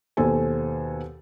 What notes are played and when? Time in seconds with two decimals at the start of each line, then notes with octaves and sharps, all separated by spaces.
0.17 D#2 B2 A4 C5 G#5